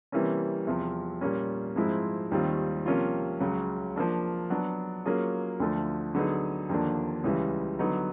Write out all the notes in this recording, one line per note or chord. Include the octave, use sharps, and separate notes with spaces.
C3 E3 G3 A#3 C#4
E2 C3 F3
A#2 G3 A#3 C#4
G#2 F3 G#3 C4 E4
D#2 D#3 G3 C4 F4
C3 F3 A#3 C#4 F4
C#2 C#3 F#3
F3 A#3 D4
F#3 B3 D4 F#4
F#3 A#3 C#4 F4 G#4
D2 D3 F3 A3
D3 F#3 B3 D#4 G#4
D#2 D3 F3 A#3 D4
C#2 C#3 E3 G3
D3 F#3 B3 D#4